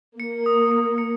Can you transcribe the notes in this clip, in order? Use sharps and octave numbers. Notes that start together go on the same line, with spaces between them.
A#3 C#7
D#6
C#7
C#7